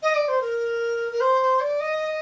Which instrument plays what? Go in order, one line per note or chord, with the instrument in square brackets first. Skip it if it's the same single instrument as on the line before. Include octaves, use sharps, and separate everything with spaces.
[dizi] D#5
D5
C5
A#4
A#4
C5
D5
D#5